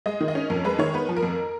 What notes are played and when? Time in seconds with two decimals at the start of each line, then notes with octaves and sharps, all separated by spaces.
0.06 G#3 D#5
0.21 D#3
0.28 D#5
0.35 C#4
0.50 F2 A#4
0.65 G#3 B4
0.79 D#3 C#5
0.94 B3 B4
1.09 F3
1.17 A#4
1.23 F2